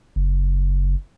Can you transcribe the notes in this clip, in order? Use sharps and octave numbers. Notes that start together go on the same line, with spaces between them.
F#1